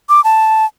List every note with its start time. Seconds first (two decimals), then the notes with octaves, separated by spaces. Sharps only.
0.09 D6
0.24 A5